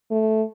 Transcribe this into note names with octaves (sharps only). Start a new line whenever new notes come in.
A3